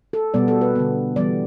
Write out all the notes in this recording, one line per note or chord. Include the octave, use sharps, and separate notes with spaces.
A4
B2 G3 B3 D5
A4
B4
D3 B3
E3 G3 B3 D5